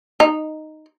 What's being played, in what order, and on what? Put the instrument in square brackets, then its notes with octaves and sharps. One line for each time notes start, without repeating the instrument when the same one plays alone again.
[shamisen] D#4